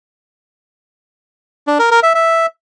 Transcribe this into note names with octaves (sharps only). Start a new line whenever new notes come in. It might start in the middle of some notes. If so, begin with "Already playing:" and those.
D4
A#4
A#4
E5
E5